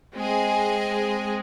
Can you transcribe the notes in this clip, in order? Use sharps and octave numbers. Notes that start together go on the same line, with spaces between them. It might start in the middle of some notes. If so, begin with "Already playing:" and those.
G#3 C4 G#4 D#5 G#5